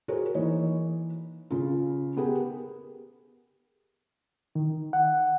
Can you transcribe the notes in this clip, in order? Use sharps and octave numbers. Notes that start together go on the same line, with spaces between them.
F#4 G#4 A#4 C5 C#5
E3 A#3 D#4 C#5
C#3 F4
B3 G4 G#4 A#4
D#3
F#5